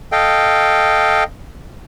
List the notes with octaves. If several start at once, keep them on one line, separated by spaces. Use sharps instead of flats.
A4 D#5 F5 G5